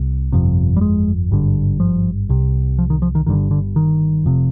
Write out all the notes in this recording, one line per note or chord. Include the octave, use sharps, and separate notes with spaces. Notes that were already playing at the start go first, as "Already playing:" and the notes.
Already playing: C2 C3
G1 F2 C3
G3
G#3
G#1 G2 D3
F3
C2 C3
F3
D#3
F3
D#3
G1 G2 D3 D#3
D3
D#3
F1 F2 C3